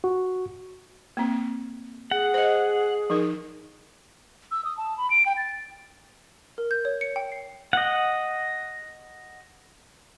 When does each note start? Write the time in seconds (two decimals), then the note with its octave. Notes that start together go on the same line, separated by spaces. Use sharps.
0.04 F#4
1.17 A#3 C4
2.11 G#4 F#5
2.34 C5 D#5
3.10 F3 D#4 A#4
4.51 E6
4.65 D#6
4.77 A5
4.98 B5
5.10 D7
5.26 G5
5.37 A6
6.58 A#4
6.71 G6
6.85 C#5
7.01 C#7
7.16 G5
7.32 C7
7.73 D#5 F#5